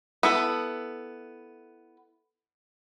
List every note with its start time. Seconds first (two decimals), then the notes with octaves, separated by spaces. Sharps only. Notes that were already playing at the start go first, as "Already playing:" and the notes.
0.23 B3 E4 A4